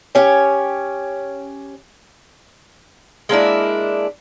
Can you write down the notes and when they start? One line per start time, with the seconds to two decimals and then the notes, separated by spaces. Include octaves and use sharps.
0.15 C#4 G4 C#5
3.29 G#3 A#3 D4 E4